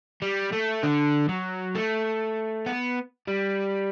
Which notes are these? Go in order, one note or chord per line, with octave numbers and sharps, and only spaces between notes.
G3
A3
D3
F#3
A3
B3
G3